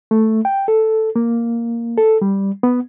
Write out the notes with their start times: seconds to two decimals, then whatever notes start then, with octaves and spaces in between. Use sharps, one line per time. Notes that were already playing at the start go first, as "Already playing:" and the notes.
0.11 A3
0.45 G5
0.68 A4
1.16 A#3
1.98 A4
2.21 G3
2.63 B3